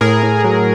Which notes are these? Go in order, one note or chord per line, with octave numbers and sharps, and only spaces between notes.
A2 G#4 A#4
A2
F#3